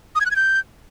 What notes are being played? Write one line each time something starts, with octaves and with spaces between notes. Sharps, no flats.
D#6
G#6
F#6
G#6
G6